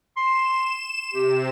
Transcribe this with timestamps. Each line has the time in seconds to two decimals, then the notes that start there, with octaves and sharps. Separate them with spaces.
0.16 C6 E7
1.13 C3 G4